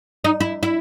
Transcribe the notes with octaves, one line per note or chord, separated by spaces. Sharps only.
D#4
E4
E4